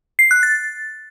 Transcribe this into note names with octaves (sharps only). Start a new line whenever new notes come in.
C7
F#6
A6